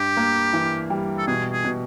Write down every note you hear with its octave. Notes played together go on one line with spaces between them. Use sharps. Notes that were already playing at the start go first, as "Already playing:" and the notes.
Already playing: G2 G4
A#3
E3
G3
A4
B2 G#4
G#4
B2